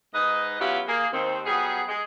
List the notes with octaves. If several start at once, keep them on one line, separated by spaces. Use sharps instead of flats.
G#2 D#4 B4 D#5
F#3 B3 C#4 E4 F4 G4
A#3 G#4
D#2 D#3 C4
F#3 G3 B3 G#4
G#3 G#4